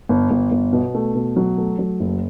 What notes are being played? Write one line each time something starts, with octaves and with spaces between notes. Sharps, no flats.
G1
G1
G1
B2
A3
B2
F#3
A3
F#3
F#1